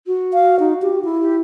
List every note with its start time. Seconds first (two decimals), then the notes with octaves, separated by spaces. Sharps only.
0.06 F#4
0.33 F5
0.59 D#4
0.82 G4
1.04 E4
1.20 G4